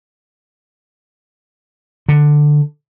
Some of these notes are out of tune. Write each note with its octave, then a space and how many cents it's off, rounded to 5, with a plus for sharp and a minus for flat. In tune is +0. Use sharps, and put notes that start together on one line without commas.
D3 +10